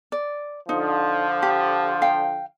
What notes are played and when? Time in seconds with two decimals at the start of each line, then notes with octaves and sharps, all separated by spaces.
0.12 D5
0.69 D3 F3 D#4
1.42 G4
2.02 F5 G5